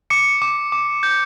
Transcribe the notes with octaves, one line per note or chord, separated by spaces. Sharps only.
D6 C#7
D6
D6
G6